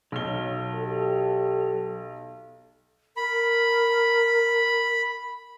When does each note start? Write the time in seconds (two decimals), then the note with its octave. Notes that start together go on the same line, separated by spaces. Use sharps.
0.12 B1 F#3 F6 G7
0.74 G4 A4
3.17 A#4 B5